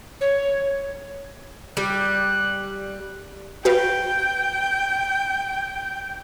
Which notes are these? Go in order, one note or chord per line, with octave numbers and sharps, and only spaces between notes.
C#5
G3 F#6
F#4 B4 F5 G5